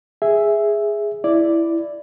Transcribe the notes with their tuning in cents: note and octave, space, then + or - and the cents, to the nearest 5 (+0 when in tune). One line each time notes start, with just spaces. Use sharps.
G#4 +0 E5 +0
E4 +5 D5 +0